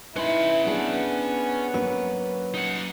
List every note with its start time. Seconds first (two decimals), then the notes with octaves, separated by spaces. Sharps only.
0.16 C#4 D#4 E4 B4 B5 C6
0.67 B3 D4 G#4
1.74 F#3 A#3 C#4 B4
2.54 D#4 F#5